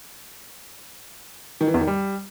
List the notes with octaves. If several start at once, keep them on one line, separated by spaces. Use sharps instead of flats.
D#3
E3
E2
D#3
G3